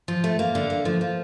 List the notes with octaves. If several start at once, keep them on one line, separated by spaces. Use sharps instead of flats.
F3
A3
A#3
D3
A#3
F3
F3